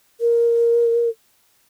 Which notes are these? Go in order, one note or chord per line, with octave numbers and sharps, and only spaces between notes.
A#4